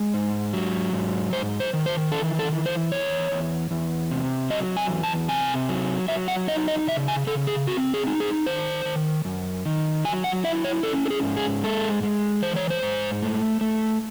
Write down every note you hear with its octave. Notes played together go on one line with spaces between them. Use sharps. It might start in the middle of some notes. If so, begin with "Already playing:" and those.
Already playing: G#3
G#2
F#3
G#2
G#2 C5
C5
D#3
C5
E3 A4
A4
E3
C5
E2 C#5
E2
E2
C3
F#3 D#5
G#5
E2
A5
C3 G#5
F#3
F#3 E5
F#5
D#4 D#5
D#5
C#3 E5
G#5
C#3 A4
G#4
C4 F#4
G#4
D#4
G#4
D#3 C5
D#3
F#2
D#3
F#3 G#5
F#5
E4 E5
C#5
C#4 A4
A4
G#4
G#2
G#4
G#3 A4
G#3
E3 C5
C#5
C5
G#2
A3
A3